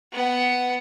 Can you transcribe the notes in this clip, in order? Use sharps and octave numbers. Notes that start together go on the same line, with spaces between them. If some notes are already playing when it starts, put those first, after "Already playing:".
B3 F#5